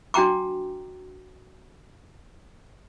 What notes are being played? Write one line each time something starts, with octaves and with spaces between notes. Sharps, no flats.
D4 F#4 G5 A#5 D6